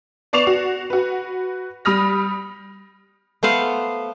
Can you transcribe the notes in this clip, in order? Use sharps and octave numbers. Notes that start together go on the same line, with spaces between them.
B3 D5 C#6 C7 E7 F7
F#4
F#4 B4
G3 B5 D#6 F6 A#6
A3 B3 C5 F5 F#5